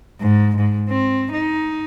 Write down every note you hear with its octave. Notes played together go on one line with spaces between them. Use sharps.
G#2
G#2
C4
D#4